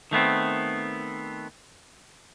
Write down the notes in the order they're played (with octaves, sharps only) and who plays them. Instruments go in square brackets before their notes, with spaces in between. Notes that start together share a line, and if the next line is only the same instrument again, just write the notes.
[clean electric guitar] D#3 A3 B3 C4